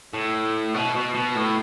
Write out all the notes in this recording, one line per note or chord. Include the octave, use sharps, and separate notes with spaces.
A2
B2
B2
B2
A2